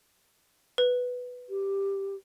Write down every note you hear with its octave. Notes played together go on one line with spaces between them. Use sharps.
B4
G4